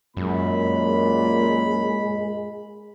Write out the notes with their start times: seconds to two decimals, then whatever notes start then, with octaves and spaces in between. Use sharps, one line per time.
0.17 F#2 A#2 G#3 B5